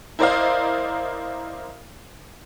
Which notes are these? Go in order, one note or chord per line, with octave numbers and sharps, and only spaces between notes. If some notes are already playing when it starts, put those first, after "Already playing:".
E4 A#4 C5 D5 D#5 F5